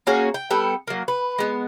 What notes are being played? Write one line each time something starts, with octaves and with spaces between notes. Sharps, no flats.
A#3 C#4 F#4 G#4
G5
G3 B3 A4 G5
F#3 A#3
B4
G#3 B3